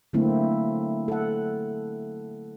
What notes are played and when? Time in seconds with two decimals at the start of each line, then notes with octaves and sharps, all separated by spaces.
0.13 D3 F#3 A3 A#3 C4 E4
1.08 A4 F#5